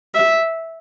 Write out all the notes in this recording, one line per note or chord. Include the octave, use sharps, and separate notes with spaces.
E5